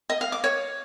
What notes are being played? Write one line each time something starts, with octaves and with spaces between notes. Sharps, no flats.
D#5
F5
D6
C#5